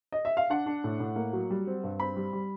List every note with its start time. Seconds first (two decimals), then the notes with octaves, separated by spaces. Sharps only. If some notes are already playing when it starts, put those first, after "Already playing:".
0.12 D#5
0.25 E5
0.37 F5
0.50 D4 F#5
0.66 D4
0.84 A2
1.00 A2
1.16 A#3
1.33 F#3
1.50 G3
1.67 C4
1.84 G2
2.00 C4 B5
2.16 G3
2.33 G3